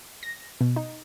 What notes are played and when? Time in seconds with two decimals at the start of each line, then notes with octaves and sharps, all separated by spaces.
0.23 A#6
0.61 B2
0.76 D#4